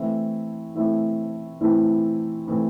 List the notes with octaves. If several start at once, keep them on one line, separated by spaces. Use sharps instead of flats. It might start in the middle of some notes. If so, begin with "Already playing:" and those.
Already playing: E3 A3 C4 E4
E3 A3 C4 E4
E3 A3 C4 E4
E3 A3 C4 E4